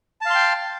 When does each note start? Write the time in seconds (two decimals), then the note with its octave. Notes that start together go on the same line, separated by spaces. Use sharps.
0.21 A5
0.26 F5
0.30 C6
0.35 G5